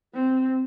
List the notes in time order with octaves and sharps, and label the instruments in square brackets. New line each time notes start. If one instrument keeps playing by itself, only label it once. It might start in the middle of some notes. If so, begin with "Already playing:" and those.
[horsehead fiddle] C4